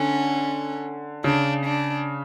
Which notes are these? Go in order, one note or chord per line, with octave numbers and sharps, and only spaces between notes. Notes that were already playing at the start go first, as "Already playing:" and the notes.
Already playing: D3 C#4
C#3 D4
D4